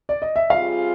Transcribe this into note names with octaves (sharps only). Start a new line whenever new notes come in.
D5
D#5
E5
G3 C4 F4 G#4 F5